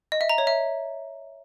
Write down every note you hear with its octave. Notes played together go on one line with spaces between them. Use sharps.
D#5
E5
A#5
C#5
E5